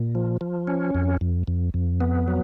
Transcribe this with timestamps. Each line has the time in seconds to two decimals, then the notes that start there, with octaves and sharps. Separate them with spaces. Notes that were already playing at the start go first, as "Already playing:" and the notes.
Already playing: A#2
0.15 F3
0.41 F3
0.67 C#4
0.95 F2
1.21 F2
1.48 F2
1.74 F2
2.01 B3
2.28 F#3